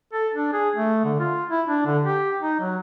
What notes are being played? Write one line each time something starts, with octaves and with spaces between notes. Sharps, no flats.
A4
D4
G#4
A3
D3
F4
E4
D4
D3
G4
D#4
F#3